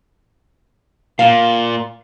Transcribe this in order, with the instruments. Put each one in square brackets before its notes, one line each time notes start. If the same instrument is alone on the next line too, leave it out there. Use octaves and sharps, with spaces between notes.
[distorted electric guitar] A#2 [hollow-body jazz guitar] F5